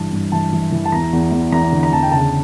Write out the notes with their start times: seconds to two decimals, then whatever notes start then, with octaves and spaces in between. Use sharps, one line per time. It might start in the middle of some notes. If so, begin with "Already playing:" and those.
Already playing: G2 E3 A5
0.12 G2
0.32 E3 A5
0.53 E3
0.72 E3
0.85 A5
0.92 E2 A#5
1.13 E2
1.32 E2
1.52 E2 A#5
1.72 D3
1.83 A#5
1.93 E2 A5
2.03 G5
2.12 C#3 A5